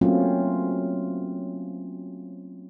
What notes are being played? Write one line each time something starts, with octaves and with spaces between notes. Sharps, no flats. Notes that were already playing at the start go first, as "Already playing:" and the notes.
F#3 A3 A#3 C4 C#4 F4